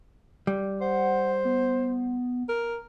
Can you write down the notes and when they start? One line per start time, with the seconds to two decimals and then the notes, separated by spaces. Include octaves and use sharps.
0.47 G3
0.81 C5 F#5
1.45 B3
2.49 A#4